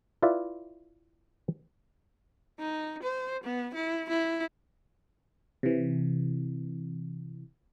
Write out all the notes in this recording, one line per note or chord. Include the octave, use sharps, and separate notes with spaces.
E4 F4 B4 D5 E5
D#4
C5
B3
E4
E4
C3 E3